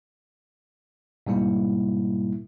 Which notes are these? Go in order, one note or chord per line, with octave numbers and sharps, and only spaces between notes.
G#2 B2 G3 A#3 E4